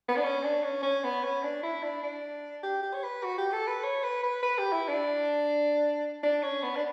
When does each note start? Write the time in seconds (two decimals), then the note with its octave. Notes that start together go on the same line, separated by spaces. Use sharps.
0.08 B3
0.16 D4
0.23 C#4
0.44 D4
0.64 C#4
0.83 C#4
1.04 B3
1.23 C#4
1.43 D4
1.63 E4
1.83 D4
2.03 D4
2.63 G4
2.83 G4
2.94 C#5
3.03 B4
3.23 F#4
3.38 G4
3.53 A4
3.68 B4
3.83 C#5
4.03 B4
4.23 B4
4.43 B4
4.58 G4
4.72 E4
4.88 D4
6.23 D4
6.43 C#4
6.63 B3
6.75 D4